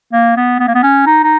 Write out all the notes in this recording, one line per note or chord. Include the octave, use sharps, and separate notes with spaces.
A#3
B3
B3
A#3
B3
C#4
D#4
D#4